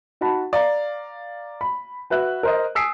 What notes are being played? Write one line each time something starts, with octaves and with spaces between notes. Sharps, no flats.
D#4 F#4 A5 B5
D5 F5 A#5
B5
F#4 B4 E5 F#6
A#4 C5 D#5
G#5 D#6 E6 B6 C7 D7